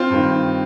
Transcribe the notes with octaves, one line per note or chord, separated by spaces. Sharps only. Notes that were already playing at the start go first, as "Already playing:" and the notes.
Already playing: C4 F4
G2 D#3